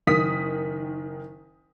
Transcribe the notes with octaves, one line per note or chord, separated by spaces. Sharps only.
F#1 D#3 D#6 B6